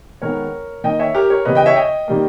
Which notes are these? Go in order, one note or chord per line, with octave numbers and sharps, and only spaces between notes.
D#3 G#3 B3 A#4 C#5
D#3 A#3 D#5 G5
C#5 E5
G4 A#4
A#4 C#5
C#3 E3 G3 B3 B4 D#5
D#5 G5
C#5 E5
D#5 G5
D#3 G3 A#3